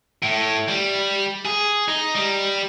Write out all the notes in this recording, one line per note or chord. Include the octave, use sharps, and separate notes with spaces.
A2
G3
G#4
D#4
G3